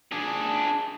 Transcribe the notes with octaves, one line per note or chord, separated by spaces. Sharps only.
D4 G#4